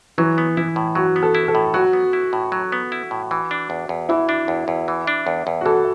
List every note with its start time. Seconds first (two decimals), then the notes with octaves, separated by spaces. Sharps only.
0.18 E3 F#3
0.38 B3
0.57 E3 E4
0.76 A2
0.95 F#3 F#4
1.16 B3
1.22 A4
1.35 E4
1.48 A4
1.55 A2
1.74 F#3 F#4
1.93 B3
2.13 E4
2.33 A2
2.52 F#3
2.72 B3
2.92 E4
3.11 A2
3.31 E3
3.51 D4
3.70 E2
3.89 E2
4.09 E3 E4
4.29 D4
4.48 E2
4.68 E2
4.88 E3
5.07 D4
5.27 E2
5.47 E2
5.61 F#4
5.65 E3 A4